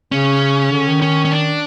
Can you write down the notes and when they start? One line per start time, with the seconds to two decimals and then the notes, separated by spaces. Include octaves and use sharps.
0.12 C#3 C#4
0.72 D3
0.88 D#3
1.02 C#4
1.25 C#4
1.32 D4